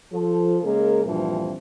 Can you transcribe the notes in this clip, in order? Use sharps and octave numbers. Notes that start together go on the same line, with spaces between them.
F3 A4
C#3 G#3 A#3 G#4 A#4
D2 G2 A#2 E3 F3 C4